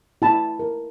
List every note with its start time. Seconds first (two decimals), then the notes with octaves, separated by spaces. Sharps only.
0.22 E4 A5 B5
0.59 A#4